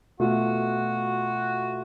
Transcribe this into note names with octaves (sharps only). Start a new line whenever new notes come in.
B2 A3 F4 F#4